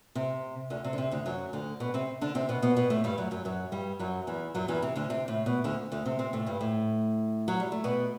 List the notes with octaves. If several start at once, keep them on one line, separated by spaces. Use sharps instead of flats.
C3
D2 D3
C3
D3
C3
D2 D3
F#2 F#3
D2 D3
B2 B3
C3 C4
D3 D4
C3 C4
B2 B3
B2 B3
B2 B3
A2 A3
G2 G3
F#2 F#3
F#2 F#3
F#2 F#3
G2 G3
F#2 F#3
E2 E3
F#2 F#3
E2 E3
C3
D2 D3
C3
A2
B2
D2 D3
D2 D3
C3 C4
C3 C4
A2 A3
G2 G3
A2 A3
F#3
G3
A3
B2 B3